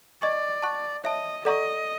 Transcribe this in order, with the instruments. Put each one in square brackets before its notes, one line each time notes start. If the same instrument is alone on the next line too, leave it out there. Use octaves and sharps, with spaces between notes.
[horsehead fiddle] D5 [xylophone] D#5 G#5 C#6
[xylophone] F#5 A5 C#6 F#6
[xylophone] C#5 E5 A5 [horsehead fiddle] D#5
[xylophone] A4 D5 F#5 A#5 C#6 [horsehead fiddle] D#5